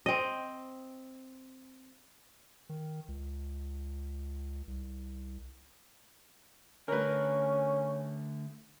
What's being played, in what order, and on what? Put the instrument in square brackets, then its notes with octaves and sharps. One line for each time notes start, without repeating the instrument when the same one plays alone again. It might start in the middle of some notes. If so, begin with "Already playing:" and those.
[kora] C4 D#5
[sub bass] D#3
C#2
C2
[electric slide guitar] D3 A3 [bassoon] C#4 [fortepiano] A#4 B4